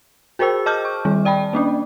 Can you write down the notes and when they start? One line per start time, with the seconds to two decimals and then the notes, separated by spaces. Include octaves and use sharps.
0.39 F#4 G#4 A#4 C5 G5 E6
0.66 D#5 A5 D6 F6 G6
0.85 C#6
1.05 D#3 G3 C4
1.25 D5 G5 A5 B5
1.53 A#3 C#4 D4